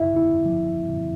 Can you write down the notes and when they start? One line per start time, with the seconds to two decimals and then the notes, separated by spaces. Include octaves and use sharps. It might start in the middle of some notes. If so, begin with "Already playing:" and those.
Already playing: E4 E5
0.16 E4
0.45 F3